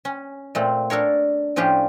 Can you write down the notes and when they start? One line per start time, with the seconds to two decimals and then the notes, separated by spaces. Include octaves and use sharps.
0.05 C#4
0.55 A#2 A3 C4
0.90 D4 A4 A#4 C#5
1.56 A2 F3 C#4 D4 G4